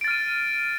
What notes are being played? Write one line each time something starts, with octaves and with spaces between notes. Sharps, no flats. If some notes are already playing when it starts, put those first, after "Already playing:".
F6 A6 D7 D#7